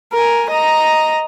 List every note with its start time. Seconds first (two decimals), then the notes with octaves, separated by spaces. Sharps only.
0.13 A#4 G#5
0.50 D#5 A#5